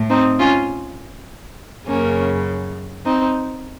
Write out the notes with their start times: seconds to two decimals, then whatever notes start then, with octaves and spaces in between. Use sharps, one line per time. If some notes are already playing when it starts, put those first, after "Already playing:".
Already playing: A2
0.09 C4 D#4
0.39 C#4 F4
1.86 F#2 C#3 A#3 C#4
3.05 C4 D#4